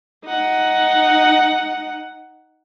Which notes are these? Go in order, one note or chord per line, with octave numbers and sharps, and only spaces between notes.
D#4 F#5